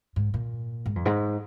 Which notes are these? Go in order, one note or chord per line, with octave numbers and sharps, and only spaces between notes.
G#2
A#2
G#2
F2
G#2